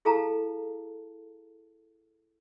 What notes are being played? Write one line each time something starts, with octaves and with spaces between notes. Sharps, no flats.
E4 G#4 A4 F5 A5 A#5